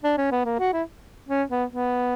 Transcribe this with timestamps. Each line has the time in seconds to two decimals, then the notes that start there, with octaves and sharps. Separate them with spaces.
0.04 D4
0.17 C#4
0.31 B3
0.45 A#3
0.59 F#4
0.73 E4
1.29 C#4
1.50 B3
1.70 B3